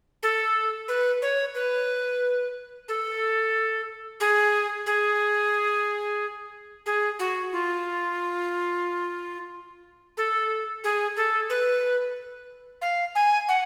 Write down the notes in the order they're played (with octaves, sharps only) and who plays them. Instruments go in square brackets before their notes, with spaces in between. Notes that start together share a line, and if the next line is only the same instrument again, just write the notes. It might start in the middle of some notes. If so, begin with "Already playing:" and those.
[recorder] A4
B4
C#5
B4
A4
G#4
G#4
G#4
F#4
F4
A4
G#4
A4
B4
F5
G#5
F#5